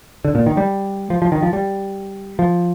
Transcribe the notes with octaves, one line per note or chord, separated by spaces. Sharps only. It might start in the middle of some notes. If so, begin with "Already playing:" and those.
D3
A#2
D#3
G3
F3
F3
D#3
F3
G3
F3